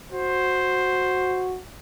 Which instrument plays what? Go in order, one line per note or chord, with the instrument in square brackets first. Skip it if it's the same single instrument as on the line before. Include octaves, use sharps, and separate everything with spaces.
[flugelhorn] F#4 [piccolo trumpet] C5